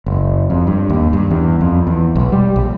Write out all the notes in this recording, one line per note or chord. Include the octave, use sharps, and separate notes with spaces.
F#1
F2
G2
D#2
G2
E2
F2
E2
B1
G3
A#1